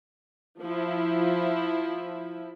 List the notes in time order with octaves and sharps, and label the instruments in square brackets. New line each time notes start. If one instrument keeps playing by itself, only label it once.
[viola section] F3 E4